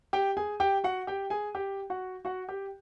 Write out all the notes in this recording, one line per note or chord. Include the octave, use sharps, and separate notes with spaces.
G4 G5
G#4 G#5
G4 G5
F#4 F#5
G4 G5
G#4 G#5
G4 G5
F#4 F#5
F#4 F#5
G4 G5